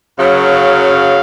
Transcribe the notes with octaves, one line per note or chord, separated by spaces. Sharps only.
F#2 C#3 F#3 F5